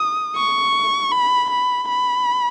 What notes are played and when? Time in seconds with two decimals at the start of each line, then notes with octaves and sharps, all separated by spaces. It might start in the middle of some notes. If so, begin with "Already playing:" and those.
Already playing: D#6
0.35 C#6
1.12 B5
1.50 B5
1.88 B5